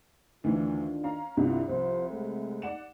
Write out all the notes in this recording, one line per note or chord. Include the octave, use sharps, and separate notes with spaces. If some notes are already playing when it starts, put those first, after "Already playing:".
D2 D#3 E3 D4 F4
C#4 F5 A#5
C2 G2 C3 D#3 E4 F4
C2 F3 C5
G#3 A3 C4
D5 F#5 E7